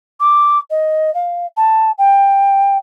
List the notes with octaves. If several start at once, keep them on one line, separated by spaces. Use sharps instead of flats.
D6
D#5
F5
A5
G5